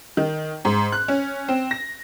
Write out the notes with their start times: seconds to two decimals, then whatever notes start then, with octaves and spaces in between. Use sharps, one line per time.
0.17 D#3
0.65 G#2
0.92 F#6
1.08 C#4
1.48 C4
1.71 A#6